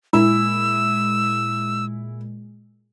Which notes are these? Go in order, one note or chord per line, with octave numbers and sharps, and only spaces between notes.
A#2 G#3 E4 E6